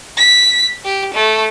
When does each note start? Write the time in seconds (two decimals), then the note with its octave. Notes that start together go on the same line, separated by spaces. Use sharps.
0.17 B6
0.85 G4
1.14 A3